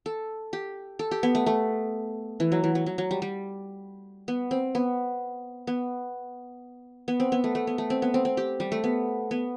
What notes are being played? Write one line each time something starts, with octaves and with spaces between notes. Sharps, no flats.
A4
G4
A4
G4
B3
A3
A3
E3
F#3
E3
F#3
F#3
F#3
G3
G3
B3
C4
B3
B3
B3
C4
B3
A3
A3
B3
A3
C4
B3
C4
C4
G4
G3
A3
B3
B3